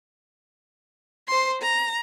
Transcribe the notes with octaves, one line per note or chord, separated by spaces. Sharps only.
C5 C6
A#5